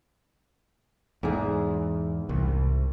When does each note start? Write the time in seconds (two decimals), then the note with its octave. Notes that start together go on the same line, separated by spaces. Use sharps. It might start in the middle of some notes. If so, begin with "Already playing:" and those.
1.23 E2 G#2 G#4
2.29 C2